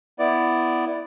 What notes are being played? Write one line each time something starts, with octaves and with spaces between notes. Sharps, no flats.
B3 E4 D5